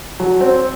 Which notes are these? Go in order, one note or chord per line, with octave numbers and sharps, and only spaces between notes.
F#3
C4